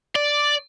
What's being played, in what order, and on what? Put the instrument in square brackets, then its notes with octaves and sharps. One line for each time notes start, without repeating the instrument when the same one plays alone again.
[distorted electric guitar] D5